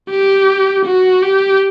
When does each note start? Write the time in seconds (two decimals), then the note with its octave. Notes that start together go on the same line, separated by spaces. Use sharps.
0.10 G4
0.85 F#4
1.22 G4